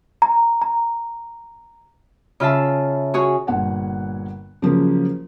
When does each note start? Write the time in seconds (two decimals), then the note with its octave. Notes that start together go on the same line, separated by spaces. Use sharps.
0.22 A#5
0.62 A#5
2.40 C#3 F4 E5 A5 E6
3.14 F#4 G#4 C#5
3.47 G1 A#2 F#5 G#5
4.62 C#3 F3 F#3 A#3